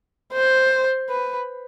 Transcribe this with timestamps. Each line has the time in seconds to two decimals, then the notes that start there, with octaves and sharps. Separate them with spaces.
0.33 C5
1.09 B4